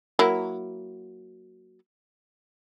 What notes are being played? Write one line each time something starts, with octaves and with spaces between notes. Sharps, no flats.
F#3 A#3 E4